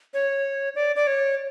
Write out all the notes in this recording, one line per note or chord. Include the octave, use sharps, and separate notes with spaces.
C#5
D5
D5
C#5